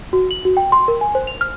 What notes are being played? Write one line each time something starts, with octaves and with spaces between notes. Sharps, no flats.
F#4
F#7
F#4
G5
C6
A#4
G#5
C5
F7
F6